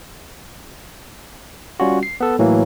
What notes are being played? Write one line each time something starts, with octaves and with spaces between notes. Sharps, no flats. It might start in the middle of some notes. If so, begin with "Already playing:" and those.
G3 C#4 F4 F#4
C7
B3 A4
A2 E3 F#3 A#3